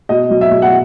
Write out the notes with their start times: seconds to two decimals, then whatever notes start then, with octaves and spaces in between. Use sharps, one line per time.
0.09 B2 D#5
0.30 F#3
0.41 E5
0.51 B2
0.62 F#5